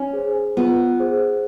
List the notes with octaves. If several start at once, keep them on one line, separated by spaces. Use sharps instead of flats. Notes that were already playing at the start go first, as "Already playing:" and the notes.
Already playing: C#4
G#4 C5
B3 F4
G#4 C5